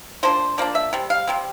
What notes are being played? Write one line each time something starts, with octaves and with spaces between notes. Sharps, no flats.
F3 A#3 D4 C5
F3 A#3 D4 D5
E5
C3 G3
F5
C3 G3 C4